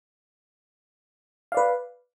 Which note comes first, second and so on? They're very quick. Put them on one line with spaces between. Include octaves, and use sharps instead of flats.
F5 D5 B4